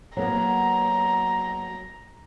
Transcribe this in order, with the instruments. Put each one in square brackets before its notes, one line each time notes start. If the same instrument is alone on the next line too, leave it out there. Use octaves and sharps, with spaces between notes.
[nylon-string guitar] F#3 A#3 B3 [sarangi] A#5